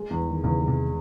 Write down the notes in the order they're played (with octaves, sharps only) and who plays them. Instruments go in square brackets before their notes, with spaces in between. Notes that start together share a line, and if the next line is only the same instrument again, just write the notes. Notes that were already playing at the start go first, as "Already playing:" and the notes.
Already playing: [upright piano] G#3 G#4
E2
D#3
[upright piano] E2 [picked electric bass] C#3
[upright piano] G#3
[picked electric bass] C3